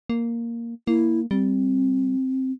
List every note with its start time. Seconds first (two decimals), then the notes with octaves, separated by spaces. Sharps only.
0.10 A#3
0.87 A#3 E4
1.31 G3 C4